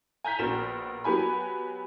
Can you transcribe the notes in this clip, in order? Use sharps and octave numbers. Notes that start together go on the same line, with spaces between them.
G#5 A#5 G6 B6
A#1 B3 F#4 A#4 E7
F#3 B3 G4 G#5 B5